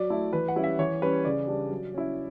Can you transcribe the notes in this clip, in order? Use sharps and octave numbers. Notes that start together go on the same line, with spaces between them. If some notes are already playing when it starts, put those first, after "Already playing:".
Already playing: F#3 D5
A3 E4
E3 B4
F#5
G3 C#4 E4
E5
E3 C#5
G3 C#4 B4
C#3 D5
G3 D4
F#3
C#4 E4